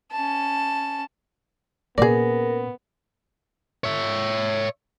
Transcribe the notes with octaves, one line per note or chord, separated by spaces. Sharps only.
C#4 A5
A#2 B3 C#4 G#4 A#4 D5
C#5 E5